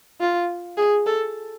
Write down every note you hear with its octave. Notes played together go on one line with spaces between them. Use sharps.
F4
G#4
A4